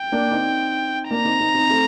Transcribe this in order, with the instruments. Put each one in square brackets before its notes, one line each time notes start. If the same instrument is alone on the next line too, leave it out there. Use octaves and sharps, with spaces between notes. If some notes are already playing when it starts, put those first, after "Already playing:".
Already playing: [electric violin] G5
[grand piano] A#3 D4
C4 D#4
[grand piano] A#3 D4 [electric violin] A#5
[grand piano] C4 D#4
C4 D#4
C4 D#4
A3 C4